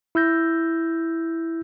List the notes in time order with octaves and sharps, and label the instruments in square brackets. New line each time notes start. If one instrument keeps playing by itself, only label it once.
[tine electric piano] E4 E6 G6 A#6